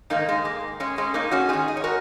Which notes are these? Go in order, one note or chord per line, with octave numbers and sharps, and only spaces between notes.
G#2 D#3 A#3 D#4
G#3
A#3
G#3 C#4
G#3 C#4
A#3 D#4
C#4 F#4
G#2 D#3 D#4 G#4
D#5
C#5
F#4 A#4